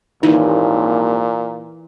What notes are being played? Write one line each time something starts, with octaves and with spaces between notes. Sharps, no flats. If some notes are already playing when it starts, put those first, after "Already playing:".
G#1 D#2 A#2 E3 D#4